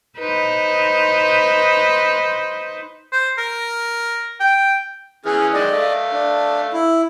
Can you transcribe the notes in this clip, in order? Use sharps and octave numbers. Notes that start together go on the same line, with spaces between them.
D#4 B4 C5
C5
A#4
G5
E3 C#4 G#4 F6
D#3 F#3 G#3 D5 D#5
A3 F5
D4
E4